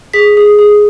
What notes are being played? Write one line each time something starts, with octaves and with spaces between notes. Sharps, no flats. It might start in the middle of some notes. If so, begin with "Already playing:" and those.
G#4 B6
G#4
G#4